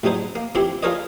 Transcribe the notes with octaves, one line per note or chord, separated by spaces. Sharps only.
A1 E2 F#3 D#4 C5
A#3
F2 E3 C4 E4 G4 C6
F4 G#4 A#4 B4 C#5 D#5